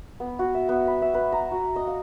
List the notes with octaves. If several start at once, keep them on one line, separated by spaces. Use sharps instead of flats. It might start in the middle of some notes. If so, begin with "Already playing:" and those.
B3
F#4
E5
B3
B5
E5
B4
A#5
F#4
D#5
F5